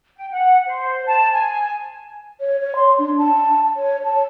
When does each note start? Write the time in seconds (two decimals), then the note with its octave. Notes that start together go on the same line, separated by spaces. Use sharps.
0.17 G5
0.31 F#5
0.66 C5
1.05 A5
1.32 G#5
2.40 C#5
2.60 C#5
2.76 C6
2.99 D4
3.18 A5
3.76 C#5
4.04 A5